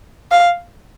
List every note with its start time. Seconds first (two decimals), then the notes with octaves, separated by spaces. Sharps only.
0.31 F5